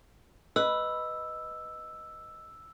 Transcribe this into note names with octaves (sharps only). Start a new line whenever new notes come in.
B4 D#5 E6